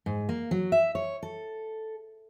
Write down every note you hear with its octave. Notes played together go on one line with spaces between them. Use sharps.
G#2
A#3
F#3
E5
C#5
A4